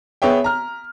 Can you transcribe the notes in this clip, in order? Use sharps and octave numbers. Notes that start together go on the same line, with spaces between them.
B3 G#4 C#5 E5 G5
A#5 F6